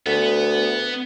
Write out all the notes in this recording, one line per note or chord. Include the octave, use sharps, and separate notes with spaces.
D2 B3